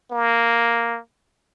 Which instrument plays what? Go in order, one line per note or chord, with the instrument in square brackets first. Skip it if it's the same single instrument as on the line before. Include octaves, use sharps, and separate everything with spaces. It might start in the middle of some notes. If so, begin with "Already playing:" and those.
[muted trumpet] A#3